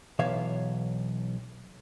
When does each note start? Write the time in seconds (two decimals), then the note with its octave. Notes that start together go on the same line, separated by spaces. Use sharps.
0.19 B1 E3 C#5 E5 F5